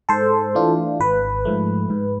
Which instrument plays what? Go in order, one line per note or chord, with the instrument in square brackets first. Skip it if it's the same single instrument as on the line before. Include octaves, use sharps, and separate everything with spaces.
[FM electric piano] G#2 A4 C5
E3 A3 D4 F4
G#1 B4
G#2 F3 A3
G#2